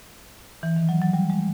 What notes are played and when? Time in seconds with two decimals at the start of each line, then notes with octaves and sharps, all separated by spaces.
0.63 E3
0.76 D#3
0.89 F#3
1.01 F#3
1.13 G3
1.30 G#3